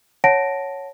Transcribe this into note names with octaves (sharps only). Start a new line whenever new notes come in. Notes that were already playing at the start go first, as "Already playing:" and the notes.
C#5 F#5 A5 A#6 D7